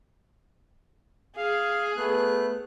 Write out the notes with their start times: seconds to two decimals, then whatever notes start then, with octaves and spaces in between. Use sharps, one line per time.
1.37 G#4 F5
1.97 A3 B3 F#6